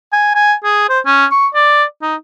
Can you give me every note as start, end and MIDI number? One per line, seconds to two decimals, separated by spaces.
0.13 0.31 80
0.35 0.53 80
0.64 0.88 68
0.89 0.99 72
1.06 1.26 61
1.32 1.47 85
1.54 1.84 74
2.02 2.15 63